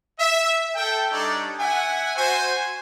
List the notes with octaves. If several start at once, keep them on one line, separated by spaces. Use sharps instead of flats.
E5
A4 G5
G3 D4 D#4 A4 C#5 D5
E5 F#5 G#5
F#4 C5 G#5